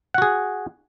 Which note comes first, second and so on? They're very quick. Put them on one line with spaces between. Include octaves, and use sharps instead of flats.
F#5 F#4 G#4